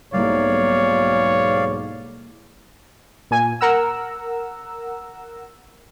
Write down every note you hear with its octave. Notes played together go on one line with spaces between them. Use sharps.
B1 G#2 G3 A#3 E4 C#5 D5 F5
A#2 G#5
A#4 F#5 A#5 E6